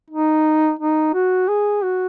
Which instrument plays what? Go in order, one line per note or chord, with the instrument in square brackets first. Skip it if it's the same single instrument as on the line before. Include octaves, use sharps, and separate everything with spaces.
[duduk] D#4
D#4
F#4
G#4
F#4